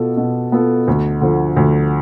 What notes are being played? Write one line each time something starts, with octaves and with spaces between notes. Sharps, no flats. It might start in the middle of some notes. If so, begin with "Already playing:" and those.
Already playing: B2 B3 F4 A4
B2
B3 F4 A4
D2
D3 F3
D2